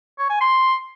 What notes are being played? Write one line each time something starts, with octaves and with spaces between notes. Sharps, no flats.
C#5
G#5
C6